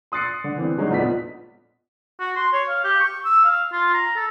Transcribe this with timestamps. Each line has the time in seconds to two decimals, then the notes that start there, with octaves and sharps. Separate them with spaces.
0.12 C6 D#6 F#6 A6 C7 C#7
0.44 D3
0.58 E3 C4
0.77 D3 F#3 G#3 D4 D#4
0.91 A#1 F2 F3 B3 D#5 B6
2.20 F#4
2.36 C6
2.53 C#5
2.68 F5
2.84 G4
3.00 C#6
3.25 E6
3.45 F5
3.72 F4
3.94 A#5
4.16 A4